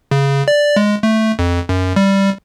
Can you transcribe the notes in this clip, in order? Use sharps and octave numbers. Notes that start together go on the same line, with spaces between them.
C#3
D5
G#3
A3
F2
F#2
G3